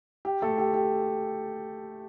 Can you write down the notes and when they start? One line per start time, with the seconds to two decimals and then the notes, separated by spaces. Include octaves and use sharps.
0.25 G4
0.42 A3 A4
0.58 G4
0.74 G4